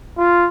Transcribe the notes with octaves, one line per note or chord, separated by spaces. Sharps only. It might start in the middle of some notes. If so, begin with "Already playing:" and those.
F4